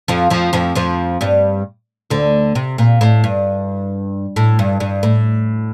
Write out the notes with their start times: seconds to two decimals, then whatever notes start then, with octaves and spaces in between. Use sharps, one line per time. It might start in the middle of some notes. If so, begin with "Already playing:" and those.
0.08 F2 F3
0.30 F2 F3
0.53 F2 F3
0.75 F2 F3
1.21 G2 G3
2.10 D2 D3
2.55 C3
2.78 A#2
3.01 A2
3.24 G2
4.36 A2
4.59 G2
4.80 G2
5.03 A2